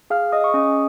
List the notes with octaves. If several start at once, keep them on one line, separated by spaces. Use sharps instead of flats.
G#4 F5 F6
D#5 D#6
C#6
C#4 D#5 D#6